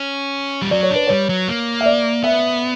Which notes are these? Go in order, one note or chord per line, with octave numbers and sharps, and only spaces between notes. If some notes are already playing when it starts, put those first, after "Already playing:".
Already playing: C#4
G3
F#3 D5
C#5
D4 B4
G3 C#5
F#3
A#3
E5
D5
B3 E5